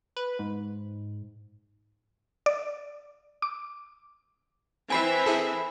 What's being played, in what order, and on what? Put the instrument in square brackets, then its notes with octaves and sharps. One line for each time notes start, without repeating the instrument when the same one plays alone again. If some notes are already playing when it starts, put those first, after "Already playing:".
[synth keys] B4
G#2
[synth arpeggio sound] D5
D6
[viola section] E3 C4 E5 [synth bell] G#5 B5 C7
[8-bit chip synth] E4 G#4 A4